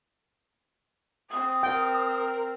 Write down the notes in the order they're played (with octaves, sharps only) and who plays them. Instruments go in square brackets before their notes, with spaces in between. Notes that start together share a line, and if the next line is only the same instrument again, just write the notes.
[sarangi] C4 [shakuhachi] D#6
[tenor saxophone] A#4 [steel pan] G5